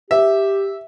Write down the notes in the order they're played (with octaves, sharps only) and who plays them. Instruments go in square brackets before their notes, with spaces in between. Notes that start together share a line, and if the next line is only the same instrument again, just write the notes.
[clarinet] G4 [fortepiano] E5